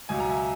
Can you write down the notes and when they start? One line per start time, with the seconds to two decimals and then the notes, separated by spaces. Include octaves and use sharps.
0.09 C#2 B2 F#3 G#5
0.20 A#5
0.30 E5 G#5